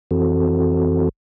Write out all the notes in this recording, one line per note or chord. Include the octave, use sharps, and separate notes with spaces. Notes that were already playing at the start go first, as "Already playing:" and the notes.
F2 E3 C4 F#4 A4